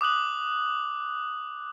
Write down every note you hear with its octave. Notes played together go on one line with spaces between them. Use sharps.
D6 D#6 F#6 F#7